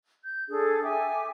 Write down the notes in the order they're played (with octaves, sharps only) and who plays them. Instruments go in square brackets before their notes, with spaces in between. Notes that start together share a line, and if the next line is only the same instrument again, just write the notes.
[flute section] G6
D4 G#4 A4
E5 G5 G#5 D6